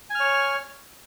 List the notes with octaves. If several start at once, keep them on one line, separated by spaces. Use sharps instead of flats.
C#5 G#5 F6